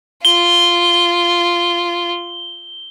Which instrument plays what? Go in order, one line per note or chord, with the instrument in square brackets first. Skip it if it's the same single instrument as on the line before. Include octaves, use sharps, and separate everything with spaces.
[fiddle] F4 [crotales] G7